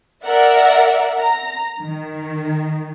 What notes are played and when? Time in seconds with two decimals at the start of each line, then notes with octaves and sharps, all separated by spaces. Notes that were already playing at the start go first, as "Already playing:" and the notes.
0.24 A#4 D5 E5 F#5
1.18 A#5
1.81 D#3